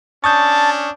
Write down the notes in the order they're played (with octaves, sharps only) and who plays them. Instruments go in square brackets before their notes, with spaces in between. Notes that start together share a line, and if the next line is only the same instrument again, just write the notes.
[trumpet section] C#4 D4 [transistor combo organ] A5 [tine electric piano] C#6 D#6 G6